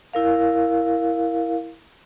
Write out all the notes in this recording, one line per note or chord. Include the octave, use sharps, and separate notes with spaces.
E4 A#4 F5